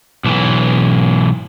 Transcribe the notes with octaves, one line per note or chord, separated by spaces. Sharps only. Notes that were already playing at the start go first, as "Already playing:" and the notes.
B1 E3